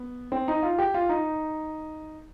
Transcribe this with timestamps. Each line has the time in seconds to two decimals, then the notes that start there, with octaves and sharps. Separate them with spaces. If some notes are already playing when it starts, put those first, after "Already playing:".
Already playing: B3
0.32 C4
0.48 D#4
0.63 F4
0.78 G4
0.94 F4
1.09 D#4